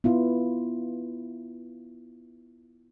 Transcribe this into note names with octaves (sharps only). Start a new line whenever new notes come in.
B3 E4 F4